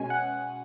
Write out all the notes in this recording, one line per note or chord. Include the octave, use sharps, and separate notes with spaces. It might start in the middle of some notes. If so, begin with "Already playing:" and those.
Already playing: B2 G#3 C#4 G#5
F#5